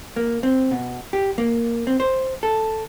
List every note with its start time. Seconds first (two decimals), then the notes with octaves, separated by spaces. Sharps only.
0.16 A#3
0.43 C4
0.71 B2
1.13 G4
1.38 A#3
1.87 C4
2.00 C5
2.43 A4